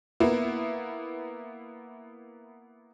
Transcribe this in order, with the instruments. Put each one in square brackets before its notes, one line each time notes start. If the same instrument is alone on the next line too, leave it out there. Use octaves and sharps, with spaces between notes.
[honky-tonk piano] A#3 B3 E4